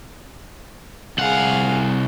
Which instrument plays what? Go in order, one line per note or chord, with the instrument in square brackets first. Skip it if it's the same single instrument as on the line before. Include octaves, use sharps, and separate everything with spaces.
[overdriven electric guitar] C2 F#5 [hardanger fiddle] G#4 F5